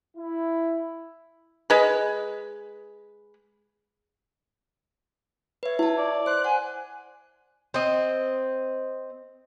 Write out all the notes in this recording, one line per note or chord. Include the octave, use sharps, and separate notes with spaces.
E4
G#3 B4
B4 C#5 E5
E4 E5 A5
D5
C5 C6 F#6
F#5 G#5
C4 D#5